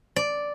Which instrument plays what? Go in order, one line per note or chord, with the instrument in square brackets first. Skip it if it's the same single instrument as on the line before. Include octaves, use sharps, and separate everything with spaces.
[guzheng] D5